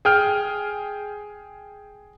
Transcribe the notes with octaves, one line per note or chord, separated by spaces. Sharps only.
G#4 G5 F6